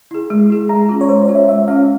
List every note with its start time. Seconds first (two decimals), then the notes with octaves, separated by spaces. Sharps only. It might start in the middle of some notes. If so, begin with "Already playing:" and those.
0.11 E4 G#4
0.30 G#3
0.50 E4 G#4
0.69 G#3 A#5
0.89 C#4 F4
1.01 C#5
1.09 G#3 C5
1.25 C#4 F4 C#5
1.35 E5
1.48 G#3 E5
1.68 C#4 F4 F5